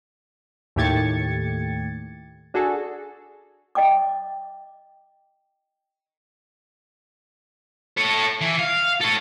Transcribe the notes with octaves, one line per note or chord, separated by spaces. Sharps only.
D#2 A2 G4 G#6 A6 C#7
D4 F#4 G#4 A4
D#5 G5 D6
A4 C#5
E3
F5
A4 C#5